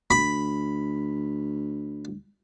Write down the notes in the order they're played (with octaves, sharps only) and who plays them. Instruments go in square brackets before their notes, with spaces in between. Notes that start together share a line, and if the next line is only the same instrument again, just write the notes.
[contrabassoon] D2 [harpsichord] B5